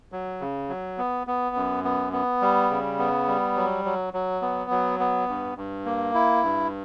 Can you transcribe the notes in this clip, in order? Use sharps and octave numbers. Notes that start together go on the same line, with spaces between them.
F#3
C#3
F#3
B3
B3
F#2
B3
B3
G3
C#3
B3
G3
F#3
F#3
F#3
B3
F#3
B3
G2
G2
A#3
E4
G2